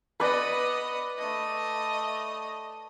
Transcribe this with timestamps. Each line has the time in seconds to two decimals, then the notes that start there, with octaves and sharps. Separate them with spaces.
0.20 B3 B4 D5 D#5
1.19 A3 D#5